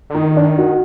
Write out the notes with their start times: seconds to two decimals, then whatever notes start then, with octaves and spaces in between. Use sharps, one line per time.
0.10 D3
0.15 D#3 D#4
0.37 D4
0.58 F#4